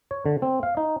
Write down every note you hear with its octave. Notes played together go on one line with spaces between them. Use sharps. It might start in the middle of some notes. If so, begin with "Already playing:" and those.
C#5
D3
C4
F5
D#4